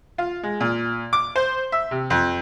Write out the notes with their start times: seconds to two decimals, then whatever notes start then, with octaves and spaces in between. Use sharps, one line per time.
0.18 F4
0.43 G#3
0.60 A#2
1.13 D6
1.36 C5
1.72 E5
1.91 C3
2.10 F2